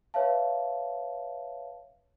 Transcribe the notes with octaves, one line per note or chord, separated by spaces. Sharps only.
B4 C#5 E5 F5 A5